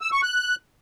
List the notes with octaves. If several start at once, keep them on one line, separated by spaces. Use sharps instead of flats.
E6
C#6
F#6